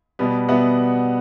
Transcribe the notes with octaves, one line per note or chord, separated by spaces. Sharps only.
B2 G3 B3
B2 G3 B3 E5 F#5